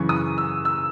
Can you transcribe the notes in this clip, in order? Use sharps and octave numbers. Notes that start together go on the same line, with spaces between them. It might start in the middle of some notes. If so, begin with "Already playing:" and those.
Already playing: F#2 C#3 E3 C#6
D#6
E6
E6